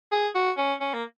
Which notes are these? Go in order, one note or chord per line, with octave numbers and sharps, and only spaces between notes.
G#4
F#4
C#4
C#4
A#3